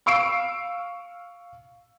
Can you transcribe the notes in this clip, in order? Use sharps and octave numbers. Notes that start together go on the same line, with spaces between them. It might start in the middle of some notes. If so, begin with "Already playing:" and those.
F5 C#6 E6 C7 D7